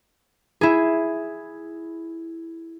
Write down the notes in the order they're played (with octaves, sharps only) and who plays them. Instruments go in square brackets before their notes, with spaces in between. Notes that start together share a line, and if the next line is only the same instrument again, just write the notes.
[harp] E4 G#4